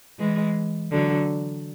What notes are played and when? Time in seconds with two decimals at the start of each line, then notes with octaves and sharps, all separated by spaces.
0.19 E3 G#3
0.91 D3 F#3